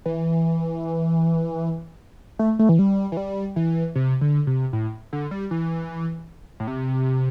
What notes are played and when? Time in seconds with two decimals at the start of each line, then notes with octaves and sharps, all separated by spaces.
0.06 E3
2.39 A3
2.59 A3
2.69 E3
2.79 G3
3.12 E3
3.17 G3
3.56 E3
3.96 C3
4.21 D3
4.47 C3
4.73 A2
5.13 D3
5.31 G3
5.51 E3
6.60 A2
6.67 C3